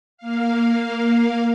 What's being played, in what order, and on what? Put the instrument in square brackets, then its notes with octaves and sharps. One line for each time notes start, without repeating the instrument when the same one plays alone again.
[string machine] A#3 F5